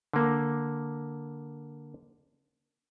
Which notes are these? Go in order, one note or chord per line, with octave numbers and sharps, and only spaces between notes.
D3 A#3